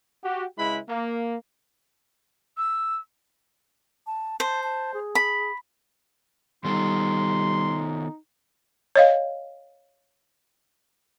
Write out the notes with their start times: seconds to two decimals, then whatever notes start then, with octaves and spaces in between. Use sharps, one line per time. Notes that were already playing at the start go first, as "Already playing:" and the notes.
0.23 F#4 G4
0.58 C#3 G#3 E4 B4 B5
0.88 A#3
2.57 E6
4.07 A5
4.40 C5 A5
4.63 A5
4.94 G#4
5.15 B5
6.64 D#3 G3 B3 D#4 A4 C6
8.96 C#5 D#5 F5